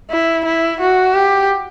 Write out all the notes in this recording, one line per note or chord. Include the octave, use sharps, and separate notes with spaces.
E4
E4
F#4
G4